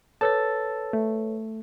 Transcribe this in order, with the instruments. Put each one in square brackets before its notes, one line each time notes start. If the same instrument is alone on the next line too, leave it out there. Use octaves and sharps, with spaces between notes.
[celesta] A4 B4 C#5 [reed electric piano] A5 E6 A6
[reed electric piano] A3